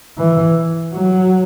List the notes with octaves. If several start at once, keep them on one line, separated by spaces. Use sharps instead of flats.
E3
F#3